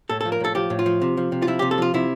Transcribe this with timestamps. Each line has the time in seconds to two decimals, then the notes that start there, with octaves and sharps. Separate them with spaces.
0.09 A2 A4
0.21 F3 A4
0.32 A#4
0.40 A2 A4
0.55 F3 G4
0.70 A2
0.79 F4
0.86 F3
1.02 C3
1.17 F3
1.32 C3
1.42 F4
1.47 F3 E4
1.59 C3 G4
1.71 A4
1.78 F3 F4
1.94 C3 E4